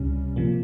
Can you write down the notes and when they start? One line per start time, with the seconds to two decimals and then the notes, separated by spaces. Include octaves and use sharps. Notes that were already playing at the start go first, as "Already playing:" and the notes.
Already playing: C#2 C3 G3 C#4
0.36 C3 F3 A#3